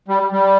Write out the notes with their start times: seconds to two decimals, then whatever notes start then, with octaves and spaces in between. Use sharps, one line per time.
0.08 G3
0.32 G3